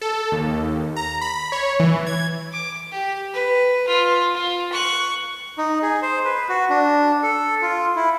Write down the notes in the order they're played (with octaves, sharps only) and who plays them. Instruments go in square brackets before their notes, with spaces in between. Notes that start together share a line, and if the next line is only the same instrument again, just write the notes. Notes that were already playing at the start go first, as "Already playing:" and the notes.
[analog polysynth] A4
D#2
A#5
B5
C#5
E3
G#6
[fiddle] D6
G4
B4
F4
F4
C#6 F#6
[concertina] D#4
G#4
C5
B4
F#4
D4
A4
F4
E4